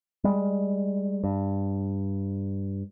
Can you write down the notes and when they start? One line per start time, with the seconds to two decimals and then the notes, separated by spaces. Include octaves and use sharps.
0.24 G3 G#3
1.24 G2